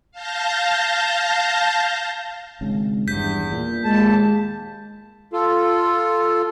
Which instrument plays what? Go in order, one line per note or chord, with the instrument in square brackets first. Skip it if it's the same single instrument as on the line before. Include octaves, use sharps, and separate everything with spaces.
[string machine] F5 A5 G6 A#6
[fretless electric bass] G#1 G#2 C#3
[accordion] E2 [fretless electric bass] G2 [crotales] G6 B6
[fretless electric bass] A#2
[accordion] D#2 A5 [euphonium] G#3
[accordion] F4 A4